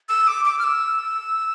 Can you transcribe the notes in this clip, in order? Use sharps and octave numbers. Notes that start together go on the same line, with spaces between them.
E6
D6
D6
F6
E6